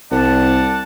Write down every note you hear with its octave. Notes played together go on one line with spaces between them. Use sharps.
C2 D5 F#5 A5